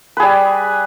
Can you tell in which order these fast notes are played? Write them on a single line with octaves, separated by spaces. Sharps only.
B4 G#4 G3